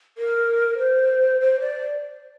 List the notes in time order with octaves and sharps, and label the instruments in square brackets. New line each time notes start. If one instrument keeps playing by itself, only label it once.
[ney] A#4
C5
C5
D5